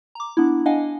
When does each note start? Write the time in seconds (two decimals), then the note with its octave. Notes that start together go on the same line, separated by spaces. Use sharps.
0.15 A#5 D6
0.37 B3 D4 E4
0.66 D4 D#5 F5 F#5 G#5